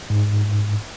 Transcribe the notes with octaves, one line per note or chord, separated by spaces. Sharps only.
G#2